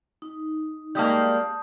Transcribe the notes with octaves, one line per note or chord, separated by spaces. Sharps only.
D#4
G3 G#3 A#3 A5 D#6 G6